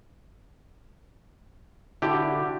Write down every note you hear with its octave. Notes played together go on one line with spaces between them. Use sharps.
D3 E4 F#4 G4